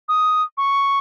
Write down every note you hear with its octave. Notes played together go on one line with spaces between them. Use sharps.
D#6
C#6